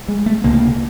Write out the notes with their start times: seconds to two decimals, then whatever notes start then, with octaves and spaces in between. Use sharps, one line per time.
0.08 G#3
0.26 A3
0.44 C#2 C3 A#3